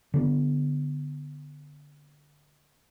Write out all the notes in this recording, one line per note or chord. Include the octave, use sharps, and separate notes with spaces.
D3 B3